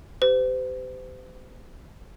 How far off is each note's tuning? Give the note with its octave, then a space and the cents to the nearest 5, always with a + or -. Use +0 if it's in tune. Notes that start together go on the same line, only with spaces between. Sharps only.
G4 +0 C5 -40